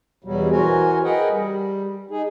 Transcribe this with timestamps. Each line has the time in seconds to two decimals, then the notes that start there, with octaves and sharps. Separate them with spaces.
0.24 E2 B2 F#3 G3
0.52 E3 F#4 A#4 C5 G#5
1.04 G#4 A#4 B4 D#5 F#5 G5
1.30 G3
2.11 D#4 G#4